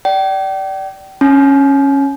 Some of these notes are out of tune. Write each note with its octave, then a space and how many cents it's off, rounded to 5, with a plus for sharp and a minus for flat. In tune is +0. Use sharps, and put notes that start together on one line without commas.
D5 +0 G5 -35
C#4 -10 G#5 +40